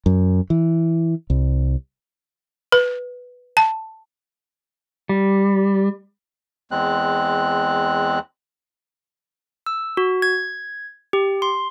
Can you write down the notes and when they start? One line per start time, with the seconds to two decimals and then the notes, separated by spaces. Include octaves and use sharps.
0.06 F#2
0.50 E3
1.30 C2
2.72 B4
3.57 A5
5.09 G3
6.71 E2 G#3 C4 F#6
9.66 E6
9.97 F#4
10.22 G#6
11.13 G4
11.42 C6